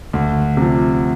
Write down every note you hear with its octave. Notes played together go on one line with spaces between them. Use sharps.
D2
C3 F3